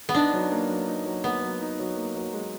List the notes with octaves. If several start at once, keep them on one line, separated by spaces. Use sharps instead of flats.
B3
D4 D#4
F#3
A#3
F#3
D#4
F#3
A#3 B3
F#3
D#4
F#3
A#3
F#3
G#3